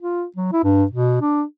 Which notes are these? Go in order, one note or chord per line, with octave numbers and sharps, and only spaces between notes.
F4
F#3
E4
G2
B2
D4